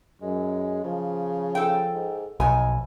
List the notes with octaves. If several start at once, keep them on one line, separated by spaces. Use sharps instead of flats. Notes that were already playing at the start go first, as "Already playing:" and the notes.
F#2 G#3
C#3 F3
A4 G5
G#2
B1 F2 D#4 G#5